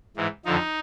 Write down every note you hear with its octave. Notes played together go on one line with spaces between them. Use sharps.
G#2 E3
F2 D3 F3 D#4